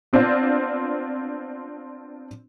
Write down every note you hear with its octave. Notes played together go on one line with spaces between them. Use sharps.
B3 C4 D4 F4 C5